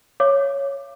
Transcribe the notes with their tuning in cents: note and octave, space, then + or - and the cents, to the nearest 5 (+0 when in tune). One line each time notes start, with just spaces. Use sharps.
C#5 +0 F5 -45 D6 +15